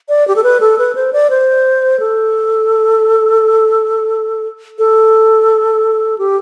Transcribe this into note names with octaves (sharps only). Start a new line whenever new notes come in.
D5
G4
A4
B4
A4
B4
C5
D5
C5
A4
A4
G4